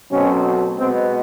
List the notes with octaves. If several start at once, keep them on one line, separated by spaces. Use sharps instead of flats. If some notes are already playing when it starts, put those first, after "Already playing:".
B2 F#3 A3 C4 C#4
B2 G#3 B3 C4